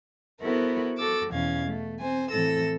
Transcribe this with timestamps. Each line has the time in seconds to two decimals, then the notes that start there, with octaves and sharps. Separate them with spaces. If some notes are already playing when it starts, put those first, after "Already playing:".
0.41 B3 E4 F#4 A4 A#4 C5
0.98 F#4 A4 D6 E6
1.29 E2 B2 E3 C#4 F5 G#6
1.69 A3
1.99 C4 C5 G#5
2.31 A2 E3 C4 A4 E6 A#6